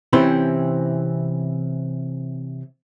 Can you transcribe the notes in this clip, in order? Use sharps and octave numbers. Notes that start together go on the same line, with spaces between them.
C3 E3 C4 C#4 E4 C5